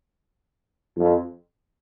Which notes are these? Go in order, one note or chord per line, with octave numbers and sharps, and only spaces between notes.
F2